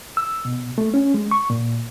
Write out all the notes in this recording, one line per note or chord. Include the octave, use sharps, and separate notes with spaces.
E6
B2
A3
C#4
G#3
C#6
A#2